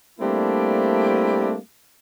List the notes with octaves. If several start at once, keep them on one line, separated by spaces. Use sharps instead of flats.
G3 A3 A#3 C4 D4 E4